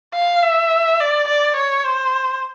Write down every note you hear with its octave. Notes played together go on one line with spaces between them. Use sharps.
F5
E5
D5
D5
C#5
C5